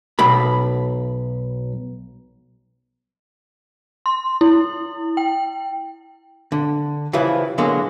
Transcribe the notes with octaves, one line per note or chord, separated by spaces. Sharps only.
B1 B5
C6
E4
G5
D3
C#3 E3 F3 G3 E4 B4
A#2 D3 F#3 G#3 A#3 B3